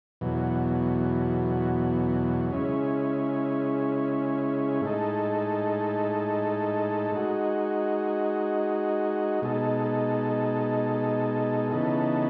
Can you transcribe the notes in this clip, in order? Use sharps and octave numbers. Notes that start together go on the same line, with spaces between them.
E2 B2 F#3
C#3 G#3 C#4 E4
A2 G#3 D#4 A4
G#3 D#4 F#4
B2 G#3 D#4 A4
C#3 E3 B3 D#4 A4